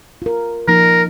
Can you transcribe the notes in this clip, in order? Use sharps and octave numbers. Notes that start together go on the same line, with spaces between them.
F4 A#4
F3 A#3 D#4 A#4